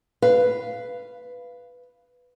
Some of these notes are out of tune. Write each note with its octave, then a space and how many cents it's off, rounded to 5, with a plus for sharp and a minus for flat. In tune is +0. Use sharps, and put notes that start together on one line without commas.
B4 +5 F5 -10